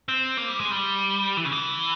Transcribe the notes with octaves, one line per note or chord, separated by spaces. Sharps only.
C4
A#3
G3
G#3
G3
E3
C#3
E3